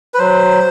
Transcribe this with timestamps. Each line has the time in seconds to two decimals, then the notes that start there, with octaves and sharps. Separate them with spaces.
0.14 B4
0.19 F#3 C5